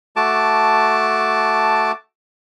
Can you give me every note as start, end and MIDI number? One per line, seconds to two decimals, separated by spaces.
0.16 1.92 57
0.16 1.92 66
0.16 1.92 81
0.16 1.92 86